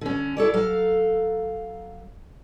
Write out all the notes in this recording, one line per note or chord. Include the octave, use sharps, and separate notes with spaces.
D3 C#4
E4 A4 C#5 D5
F#3 A4 F5